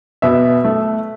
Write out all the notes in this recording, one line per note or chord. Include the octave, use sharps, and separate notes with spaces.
B2 E5
A3